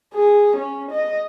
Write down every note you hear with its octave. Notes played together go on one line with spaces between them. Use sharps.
G#4
C#4
D#5